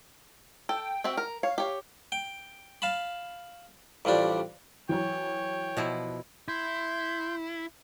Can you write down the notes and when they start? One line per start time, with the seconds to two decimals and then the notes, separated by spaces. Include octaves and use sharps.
0.69 A4 G5
1.04 C4 F#4 E5
1.17 A#4
1.43 C#5 F5
1.58 G4 C#5
2.12 G5
2.82 F5 A5 B5
4.05 A1 F3 G3 D4
4.89 E3 F#3 C#5 G5
5.77 B2 F3 E4
6.48 E4 C6 G6